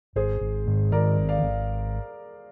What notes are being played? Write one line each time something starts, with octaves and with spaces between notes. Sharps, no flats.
G#1 G#4 C5
G#1
G#2
D#3 A#4 D5
G#1
D5 F5
G#1